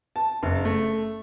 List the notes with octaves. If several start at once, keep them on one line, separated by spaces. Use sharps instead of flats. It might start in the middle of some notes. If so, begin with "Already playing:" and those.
A5
F#1
A3